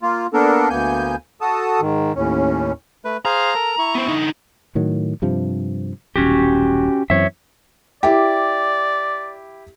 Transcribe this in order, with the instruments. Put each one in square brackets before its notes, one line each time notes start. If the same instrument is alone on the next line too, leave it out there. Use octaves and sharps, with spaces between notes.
[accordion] A#3 F4
A#3 B3 D4 A4 A#4
D2 A#3 B3 G#5 G6
F#4 A4 A5 D#6
G#2 D#3
D#2 A2 C#4
[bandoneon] A3 B4
[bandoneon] G#4 C5 F5 [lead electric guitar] A#5
[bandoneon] A4 A#4
E4 C#6
[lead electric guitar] B3 C5
D3 D#4
[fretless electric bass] A2 D#3 F#3
G2 C3 F3
[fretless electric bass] D#1 B1 [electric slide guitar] C#4 F#4 G4
[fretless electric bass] F#2 E3 C4 [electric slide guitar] C#5 E5
[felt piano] E4 G4 [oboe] D5